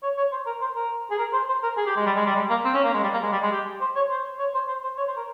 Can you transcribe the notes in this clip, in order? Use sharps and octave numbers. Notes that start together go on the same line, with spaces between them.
C#5
C#5
C5
A#4
C5
A#4
G#4
A#4
C5
C5
A#4
G#4
G4
G#3
G3
G#3
G3
G#3
A#3
C4
C#4
A#3
G#3
G3
A#3
G#3
G3
G#3
G4
C5
C#5
C5
C#5
C5
C5
C5
C#5
C5
A#4